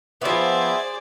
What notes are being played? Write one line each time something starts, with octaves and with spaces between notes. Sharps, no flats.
F3 B3 G#4 C5 D5 E5